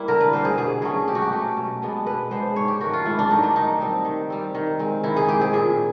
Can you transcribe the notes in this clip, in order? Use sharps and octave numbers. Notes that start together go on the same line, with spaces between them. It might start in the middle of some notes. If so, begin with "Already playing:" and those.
Already playing: G3 A#3 E4
D3 A#4
B4
G3 A#3 C5
G#4
B2 G#4
F#3 A3 C#4 G#4
B2 G4
F#4
G4
F#3 A3 C#4 G4
B2
G#3 B3 D4
B2 B4
G#3 B3 D4 C5
G#2 C#5
G4
D#3 F#3 A3 F#4
F4
G#2 E4
D4
D#3 F#3 A3 D#4
D4
D#3 D#4
G3 C4
D#3
G3 C4
D#3
G#3 C4
D#3 E4
G#4
G#3 C4 G4
G#4
A#2 G#4